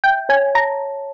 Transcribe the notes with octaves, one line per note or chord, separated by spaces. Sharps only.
E5 G5
C#5 G#5
A5 A#5